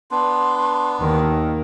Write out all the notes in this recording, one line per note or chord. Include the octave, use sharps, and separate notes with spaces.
B3 D4 C6
D#2 D#3